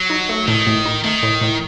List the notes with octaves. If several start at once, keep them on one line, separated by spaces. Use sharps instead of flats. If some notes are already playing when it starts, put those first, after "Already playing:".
Already playing: F#3
D#4
A3
A2 D#3
A2
D#4
D#3 A3
A2
A2